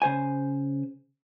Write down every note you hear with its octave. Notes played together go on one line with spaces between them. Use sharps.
C#3 C5 G#5